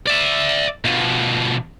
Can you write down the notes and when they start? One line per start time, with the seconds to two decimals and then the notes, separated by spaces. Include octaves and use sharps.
0.07 D5 E5
0.84 B2 F3